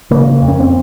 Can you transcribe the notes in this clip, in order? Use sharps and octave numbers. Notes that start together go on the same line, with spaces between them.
C#3 A#3
F2
C#4
C4